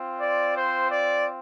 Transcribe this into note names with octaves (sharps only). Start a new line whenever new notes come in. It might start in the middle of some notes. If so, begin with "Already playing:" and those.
Already playing: C4 F4
D5
C5
D5